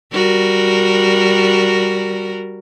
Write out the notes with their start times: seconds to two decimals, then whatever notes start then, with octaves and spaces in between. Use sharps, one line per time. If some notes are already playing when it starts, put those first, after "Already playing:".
0.13 G3 F#4 A#4